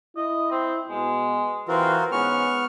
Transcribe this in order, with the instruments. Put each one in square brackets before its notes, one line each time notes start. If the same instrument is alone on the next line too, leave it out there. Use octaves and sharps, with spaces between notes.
[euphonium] E4 [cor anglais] D#5
[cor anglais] C4
[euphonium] B2 [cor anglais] G#3
[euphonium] E3 [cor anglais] C4 [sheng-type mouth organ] F4 F#4 A#4
[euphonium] G#2 [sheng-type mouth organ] B3 C#6 F6 [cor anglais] C#4